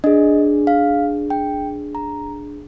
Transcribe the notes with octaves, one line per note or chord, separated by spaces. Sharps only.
D4 G#4 D#5
F5
G5
A#5